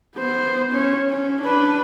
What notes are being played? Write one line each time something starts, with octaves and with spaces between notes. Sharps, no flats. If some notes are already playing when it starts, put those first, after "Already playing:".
B3 C5
C#4 C#5
C#4
D4 B4